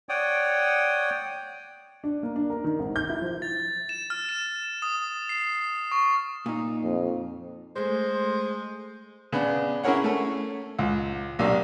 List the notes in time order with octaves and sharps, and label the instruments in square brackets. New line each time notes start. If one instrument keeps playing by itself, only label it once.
[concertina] C#5 D5 F#5 G5 D#6
[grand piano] D4
A#3
D4
A#4
D#3
G#1
G6
E4
F3
[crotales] A6
E7
F6
E7
D#6
C7
C#6
[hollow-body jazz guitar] A#2 D#4
[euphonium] F2
[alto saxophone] G#3 [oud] A3 G#4 [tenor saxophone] C5
[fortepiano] C#3 B3 D4
C#4 E4 G#4 A#4 C#5 F#5
A3 C#4
C#2
B1 C3 A#3 D4